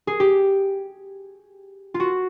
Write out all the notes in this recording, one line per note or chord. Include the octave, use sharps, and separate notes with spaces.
G#4
G4
F4
F#4